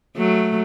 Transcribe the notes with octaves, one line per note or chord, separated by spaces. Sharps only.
F#3 A3